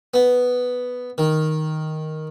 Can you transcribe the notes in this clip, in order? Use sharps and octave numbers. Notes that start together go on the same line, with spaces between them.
B3
D#3